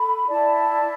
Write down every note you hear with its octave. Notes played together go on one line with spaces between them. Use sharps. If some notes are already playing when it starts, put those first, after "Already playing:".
Already playing: A4 B5
E4 D5 A5